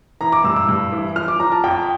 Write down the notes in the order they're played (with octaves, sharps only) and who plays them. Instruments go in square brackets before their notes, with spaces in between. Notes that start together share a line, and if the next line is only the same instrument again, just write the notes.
[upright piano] E3 [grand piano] A#5
[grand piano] D6
[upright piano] G2 [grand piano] E6
[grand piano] E6
[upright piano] G2
E3
[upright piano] F3 [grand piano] F6
[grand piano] D6
[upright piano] F3 [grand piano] A#5
[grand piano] A5
[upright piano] F2 [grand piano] G5